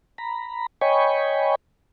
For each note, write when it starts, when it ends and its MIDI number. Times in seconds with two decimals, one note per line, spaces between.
0.18 0.66 82
0.18 0.66 83
0.81 1.55 73
0.81 1.55 75
0.81 1.55 79
0.81 1.55 80
0.81 1.55 83
0.81 1.55 85